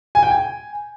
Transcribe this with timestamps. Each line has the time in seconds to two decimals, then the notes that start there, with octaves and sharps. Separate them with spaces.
0.15 G#5
0.23 G5
0.30 G#5